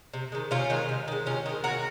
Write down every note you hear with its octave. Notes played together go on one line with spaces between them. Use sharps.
C3
D#3 G#3
C3 C#4 F4
D#3 G#3
C3
D#3 G#3
C3 C#4 F4
D#3 G#3
C#3 F#4 A#4